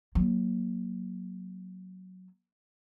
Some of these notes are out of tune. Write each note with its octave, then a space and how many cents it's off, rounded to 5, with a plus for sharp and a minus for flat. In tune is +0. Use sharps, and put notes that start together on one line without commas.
F#3 +0 A#3 +10